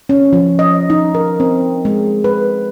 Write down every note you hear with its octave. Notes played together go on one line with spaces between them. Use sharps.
C#4
F3
D#5
D#4
A#4
C4
G#3
B4